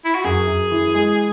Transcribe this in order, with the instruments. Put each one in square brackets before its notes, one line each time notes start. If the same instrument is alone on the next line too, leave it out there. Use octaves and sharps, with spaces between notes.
[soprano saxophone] E4
F#4
[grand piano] F#2 [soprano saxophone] G#4
[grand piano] F#2
E3
G#3